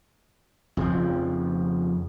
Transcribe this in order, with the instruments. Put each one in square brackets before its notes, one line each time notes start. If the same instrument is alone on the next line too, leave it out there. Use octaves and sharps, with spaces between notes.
[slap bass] F2 C#3 F3